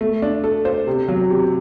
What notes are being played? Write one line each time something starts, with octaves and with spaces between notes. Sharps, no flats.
A3
D4
A4
C5
C3
F#3
C3